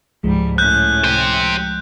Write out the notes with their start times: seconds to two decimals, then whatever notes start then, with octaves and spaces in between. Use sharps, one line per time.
0.24 C#2 G#2 F3 G3 G#3
0.58 A2 C#4 F#6 G6
1.04 G4 C5